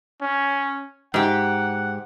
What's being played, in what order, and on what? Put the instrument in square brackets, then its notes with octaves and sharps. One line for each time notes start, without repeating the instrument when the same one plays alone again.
[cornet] C#4
[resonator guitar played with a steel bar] G#2 G4 [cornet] F#5